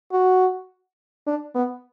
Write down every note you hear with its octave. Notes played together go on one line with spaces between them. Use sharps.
F#4
D4
B3